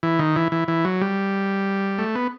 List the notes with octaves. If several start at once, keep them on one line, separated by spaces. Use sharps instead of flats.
E3
D#3
E3
E3
E3
F#3
G3
A3
B3